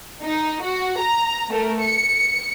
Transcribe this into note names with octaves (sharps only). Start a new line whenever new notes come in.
D#4
F#4
A#5
A3 A#4
C#7